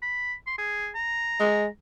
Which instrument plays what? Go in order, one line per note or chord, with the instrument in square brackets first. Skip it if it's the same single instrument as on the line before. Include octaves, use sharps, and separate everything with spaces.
[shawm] B5
C6
G#4
A#5
[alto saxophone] G#3